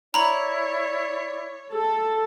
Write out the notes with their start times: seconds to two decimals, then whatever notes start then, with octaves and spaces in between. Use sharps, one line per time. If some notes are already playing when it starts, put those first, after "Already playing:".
0.14 E4 C#5 D5 A#5 B5 F7
1.73 A4